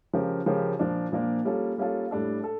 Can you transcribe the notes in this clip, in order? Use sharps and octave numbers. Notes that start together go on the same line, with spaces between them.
C#3 F3 C#4 G4 A#4
C#3 F3 C#4 G4 A#4
A#2 F3 A#3 D4
A#2 F3 A#3 D4
G3 A#3 C#4 F4 A4
G3 A#3 C#4 F4 A4
A2 G3 D4 A4
A4